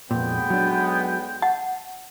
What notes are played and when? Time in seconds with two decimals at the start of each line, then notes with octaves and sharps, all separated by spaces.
0.11 B1 F2 A#2 G#3 B3 G5
0.50 F#3 D4
1.42 F#5 A5